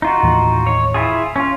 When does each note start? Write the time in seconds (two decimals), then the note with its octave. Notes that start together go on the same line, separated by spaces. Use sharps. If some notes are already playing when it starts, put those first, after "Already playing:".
0.02 D#4 F4 F#4
0.23 D#2 A2 E3
0.67 C#5
0.94 E4 F4 G#4
1.36 C#4 F4